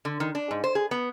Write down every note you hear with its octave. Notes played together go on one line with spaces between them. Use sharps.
D3
D#3
D4
G#2
C5
G#4
B3